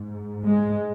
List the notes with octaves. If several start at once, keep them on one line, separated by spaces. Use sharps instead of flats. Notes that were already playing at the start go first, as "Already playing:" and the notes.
Already playing: G#2
G#3